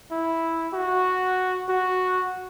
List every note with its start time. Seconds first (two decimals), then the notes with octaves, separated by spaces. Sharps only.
0.12 E4
0.74 F#4
1.69 F#4